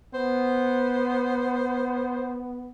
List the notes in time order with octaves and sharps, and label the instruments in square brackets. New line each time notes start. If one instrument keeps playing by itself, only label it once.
[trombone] B3 [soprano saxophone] C5